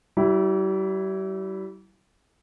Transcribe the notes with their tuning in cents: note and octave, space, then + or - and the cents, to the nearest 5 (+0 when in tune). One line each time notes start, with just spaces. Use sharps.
G3 -40 E4 +0